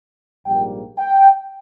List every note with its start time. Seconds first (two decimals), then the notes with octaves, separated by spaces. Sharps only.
0.46 A#1 G#2 G3 A#3 G5
0.98 G5